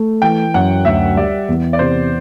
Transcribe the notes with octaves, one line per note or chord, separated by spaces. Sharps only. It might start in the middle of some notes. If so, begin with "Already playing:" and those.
Already playing: A3
E3 G5
F#2 F#5
D2 E5
G3 D5
E2
D5
C3 C5